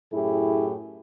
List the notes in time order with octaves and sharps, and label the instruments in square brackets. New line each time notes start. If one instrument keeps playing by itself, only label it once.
[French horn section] F#2 A2 E4 G4 G#4